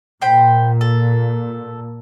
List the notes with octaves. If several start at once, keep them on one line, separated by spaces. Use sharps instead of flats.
A#2 C5 G5 B5
A4